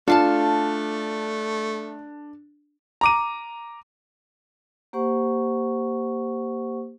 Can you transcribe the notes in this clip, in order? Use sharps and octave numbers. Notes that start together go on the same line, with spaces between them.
A3 D4 F4 A4 F5 A5
A#5 D6 D#7
A#3 G4 C5 F#5 C#6